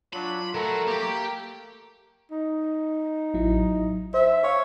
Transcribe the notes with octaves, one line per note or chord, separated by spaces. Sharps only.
F#3 D4 F4 B5
F#3 A3 A4 A#4 B5
A#3 G4 G5
D#4
A1 F#3 E4
C5 E5
C5 C#5 E5 F5